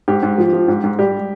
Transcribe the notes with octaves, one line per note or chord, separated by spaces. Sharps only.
G#2 G4
G#2
F3
F3
G#2
G#2
G3 G4